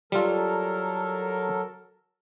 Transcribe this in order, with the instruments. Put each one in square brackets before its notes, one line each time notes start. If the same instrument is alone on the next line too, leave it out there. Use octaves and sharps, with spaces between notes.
[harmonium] F#3 A4 A#4 [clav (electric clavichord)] G3 F4